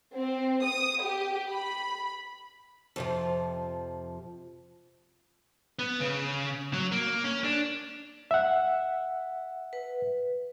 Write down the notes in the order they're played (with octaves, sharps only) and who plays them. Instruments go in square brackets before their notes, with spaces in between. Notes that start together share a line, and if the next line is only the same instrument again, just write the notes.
[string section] C4
D#6
G4
B5
[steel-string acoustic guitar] F2 C3 F3
[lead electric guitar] B3
C#3
F#3
A#3
C#4
D4
[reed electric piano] E5 F#5
[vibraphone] B4